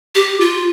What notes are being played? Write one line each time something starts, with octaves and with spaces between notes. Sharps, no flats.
G4
F4